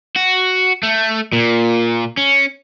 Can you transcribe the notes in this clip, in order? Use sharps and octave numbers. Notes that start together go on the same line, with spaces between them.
F#4
A3
A#2
C#4